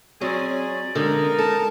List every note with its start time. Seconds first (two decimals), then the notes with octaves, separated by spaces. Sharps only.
0.21 F#3 G#3 C4 C#4 G#4 D5
0.95 D3 G#3 B3 C#4 D#4 A#4
1.38 A4 A5